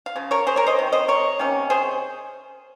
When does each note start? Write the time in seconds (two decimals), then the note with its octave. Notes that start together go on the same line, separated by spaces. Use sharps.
0.06 F5
0.16 C#3 F3
0.31 A#4 C#5
0.47 G#4 C5
0.56 A#4 C#5
0.67 C5 D#5
0.79 C3 D#3
0.92 C5 D#5
1.08 A#4 C#5
1.39 C3 D#3 A#3 C#4
1.70 G#4 C5